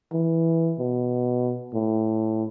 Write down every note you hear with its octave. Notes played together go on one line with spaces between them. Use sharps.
E3
B2
A2